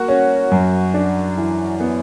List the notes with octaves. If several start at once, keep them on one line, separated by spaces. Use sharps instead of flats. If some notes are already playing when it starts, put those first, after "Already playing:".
Already playing: A#3 F#4
C#4
F#2
D4
E3
B3